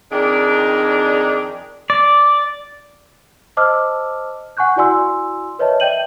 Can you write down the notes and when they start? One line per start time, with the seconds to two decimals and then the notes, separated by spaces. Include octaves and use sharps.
0.11 F2 D#3 D4 D#4 G#4 D5
1.90 D5
3.57 C5 D#5 A5 D6 E6 F6
4.57 F#5 G#5 C#6 F#6 G6
4.76 E4 F#4 D5 G#5 C6 E6
5.59 A#4 B4 C#5 D#5 E5 A5
5.80 D5 E5 G5 G6 D#7 F#7